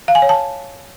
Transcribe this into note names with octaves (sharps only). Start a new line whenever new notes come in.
F5
G#5
C#5
A5